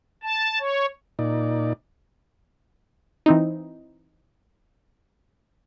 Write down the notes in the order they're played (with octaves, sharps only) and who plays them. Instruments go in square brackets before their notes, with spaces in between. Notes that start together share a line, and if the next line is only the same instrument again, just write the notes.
[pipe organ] A5
C#5
[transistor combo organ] A#2 D#4 D5
[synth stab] E3 C4 D#4